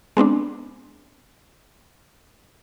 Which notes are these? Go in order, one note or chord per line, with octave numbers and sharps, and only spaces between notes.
G#3 B3 C4 D4